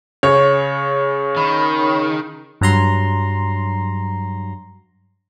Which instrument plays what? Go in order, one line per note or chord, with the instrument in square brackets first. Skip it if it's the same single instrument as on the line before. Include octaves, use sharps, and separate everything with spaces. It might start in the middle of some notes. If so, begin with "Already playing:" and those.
[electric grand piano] C#3 [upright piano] C#5
[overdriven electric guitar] D#3 [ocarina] B5
[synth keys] G2 F#3 A#5 C6